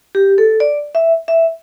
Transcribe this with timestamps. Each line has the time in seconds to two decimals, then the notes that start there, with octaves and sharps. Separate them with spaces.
0.15 G4
0.38 A4
0.60 D5
0.95 E5
1.28 E5